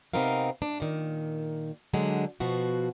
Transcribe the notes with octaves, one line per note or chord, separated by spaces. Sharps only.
C3 B3 C4 D#4 A#4 F5
D4
A#2 D#3
D3 F#3 G#3 D4
B2 F3 F#4